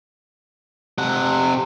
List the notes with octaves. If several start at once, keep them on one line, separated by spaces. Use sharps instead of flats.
C3 F#5